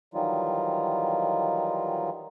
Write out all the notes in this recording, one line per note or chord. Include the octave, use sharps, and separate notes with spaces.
D#3 E3 F#3 G3 D#4 F4